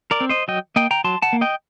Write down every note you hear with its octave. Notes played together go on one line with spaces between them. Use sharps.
A#4 D5
C4
C5 D#5
F#3 D#5 G5
A#3 D#5 G5
G5 A#5
F#3 A5 C6
F#5 A5
A#3
D#5 G5